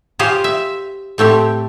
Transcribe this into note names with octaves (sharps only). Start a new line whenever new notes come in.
F4 G4 G#4 C5 C#5
E5
A2 A3 C4 G4